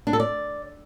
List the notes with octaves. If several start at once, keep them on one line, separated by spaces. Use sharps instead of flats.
D4
A4
D5